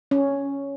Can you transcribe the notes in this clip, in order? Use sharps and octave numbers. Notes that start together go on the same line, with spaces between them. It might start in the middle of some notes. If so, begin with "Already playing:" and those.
C#4